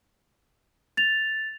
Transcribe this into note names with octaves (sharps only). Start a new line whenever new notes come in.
A6 F7